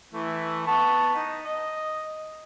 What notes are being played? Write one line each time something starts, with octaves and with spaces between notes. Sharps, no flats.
E3 A3
B3 A5 C#6
D#4
D#5